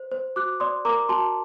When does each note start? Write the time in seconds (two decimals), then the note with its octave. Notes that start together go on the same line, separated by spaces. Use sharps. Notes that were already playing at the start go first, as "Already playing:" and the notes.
Already playing: C5
0.11 C5
0.36 F#4 D6 F#6
0.60 D5 C6 D#6
0.85 A#4 A#5 D6
1.09 F#4 A5 C6